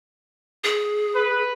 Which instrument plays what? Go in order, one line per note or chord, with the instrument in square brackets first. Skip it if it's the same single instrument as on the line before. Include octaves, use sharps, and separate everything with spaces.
[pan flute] G#4
[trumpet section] B4